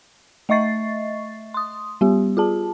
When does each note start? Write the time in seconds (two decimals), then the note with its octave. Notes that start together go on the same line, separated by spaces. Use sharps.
0.49 A3 D#5 E5 C#6 A6 C7
1.54 C6 D#6
2.01 G3 B3 G4
2.37 F4 G#4 A5